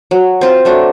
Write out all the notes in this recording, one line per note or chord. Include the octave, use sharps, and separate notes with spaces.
F#3
C4 F4
F#3 A3 D4